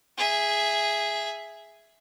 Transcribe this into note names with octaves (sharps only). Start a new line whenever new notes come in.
G#4 E5